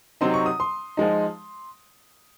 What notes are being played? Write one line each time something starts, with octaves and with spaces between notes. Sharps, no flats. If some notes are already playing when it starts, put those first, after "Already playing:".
C3 F#3 C4 D#4 C6
C#6
D#6
C6
F3 G#3 D#4